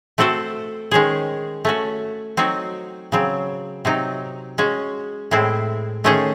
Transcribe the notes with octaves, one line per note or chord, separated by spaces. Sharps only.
A3 C4 F#4 A4 C5
D#3 G#3 C#4 G#4 C5
A3 C#4 F#4
F#3 C4 D#4 F#4
C#3 F#3 C4
C3 F#3 C4 D#4
G#3 C#4 F#4
A2 G#3 C4 E4
D#3 A3 C#4 G#4 C5